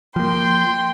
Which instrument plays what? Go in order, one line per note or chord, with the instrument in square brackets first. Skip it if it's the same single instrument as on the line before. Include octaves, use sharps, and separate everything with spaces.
[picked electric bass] F3 A#3 [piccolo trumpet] G5 [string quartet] C6